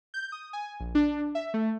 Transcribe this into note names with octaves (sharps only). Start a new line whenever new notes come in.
G6
D#6
G#5
A#1
D4
E5
A3